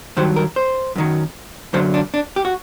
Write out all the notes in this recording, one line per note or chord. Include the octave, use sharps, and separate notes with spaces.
G2 D#3 F#3 C5
A#4
C5
F#2 D#3 F#3
F#2 D3 F#3 C5
D4
D4
G4
F#4